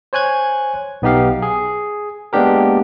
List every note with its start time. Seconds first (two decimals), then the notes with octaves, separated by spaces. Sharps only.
0.13 C5 C#5 G#5 F#6 G#6
1.02 B1 B3 D#4 G4 F5
1.42 G#4
2.33 G#3 A#3 B3 D4 G4 A#4